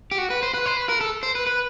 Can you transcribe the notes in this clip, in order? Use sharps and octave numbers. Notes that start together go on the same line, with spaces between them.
G4
F#4
B4
C5
B4
C5
B4
A#4
A4
C5
B4
B4